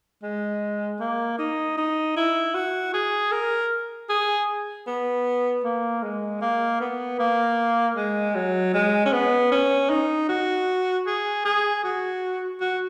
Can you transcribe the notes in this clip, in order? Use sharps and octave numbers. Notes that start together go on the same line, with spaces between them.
G#3
A#3
D#4
D#4
E4
F#4
G#4
A#4
G#4
B3
A#3
G#3
A#3
B3
A#3
G#3
F#3
G#3
C#4
B3
C#4
D#4
F#4
G#4
G#4
F#4
F#4